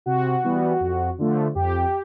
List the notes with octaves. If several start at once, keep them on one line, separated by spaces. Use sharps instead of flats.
C3 F#4
E3 G3 B3
F2
D3 F3 A3
F2 G4